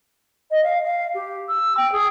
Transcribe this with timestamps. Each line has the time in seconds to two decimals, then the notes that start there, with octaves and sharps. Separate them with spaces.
0.51 D#5
0.63 F5
0.84 F5
1.14 G4
1.49 E6
1.77 G5
1.92 G#4